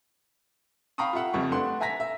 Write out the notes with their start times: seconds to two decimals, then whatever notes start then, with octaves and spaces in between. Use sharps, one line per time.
0.98 F5 G5 A#5 B5 C#6 D#6
1.13 F4 G4 E5 F#5
1.33 F#1 F2 G3 C#6
1.51 A3 D4 B4 F#5 C6
1.80 E5 G#5 A#5 A#6 B6
2.00 E5